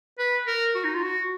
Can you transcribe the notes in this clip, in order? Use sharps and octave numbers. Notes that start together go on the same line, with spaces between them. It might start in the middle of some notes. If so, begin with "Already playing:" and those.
B4
A#4
F#4
D#4
F4
F#4